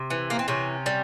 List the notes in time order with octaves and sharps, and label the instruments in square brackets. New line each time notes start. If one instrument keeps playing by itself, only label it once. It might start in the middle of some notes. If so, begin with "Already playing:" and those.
Already playing: [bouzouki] C3
E3
A#3
C4
C3 C#4
G3